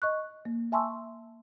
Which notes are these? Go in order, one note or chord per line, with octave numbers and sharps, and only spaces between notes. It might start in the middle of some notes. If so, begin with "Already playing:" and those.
D#5 C#6 F#6
A#3
E5 G#5 A5 C6 C#6 E6